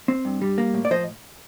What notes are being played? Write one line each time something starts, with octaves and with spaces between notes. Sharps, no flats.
C4
G2
G3
A#3
A2
D5
F3 C5 D#5